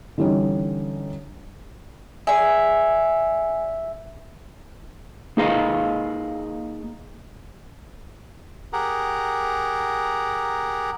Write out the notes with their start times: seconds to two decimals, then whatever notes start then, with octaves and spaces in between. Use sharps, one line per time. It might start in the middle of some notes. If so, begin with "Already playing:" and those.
0.18 D3 E3 G3 C#4 D#4
2.27 G#4 D5 E5 G#5
5.37 A#3 D#4 G#4 D#5 F5
8.73 G4 G#4 A#4 F#5 A#5